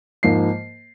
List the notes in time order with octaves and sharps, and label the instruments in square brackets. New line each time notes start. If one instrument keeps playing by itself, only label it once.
[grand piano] G#2 F3 A#3 C7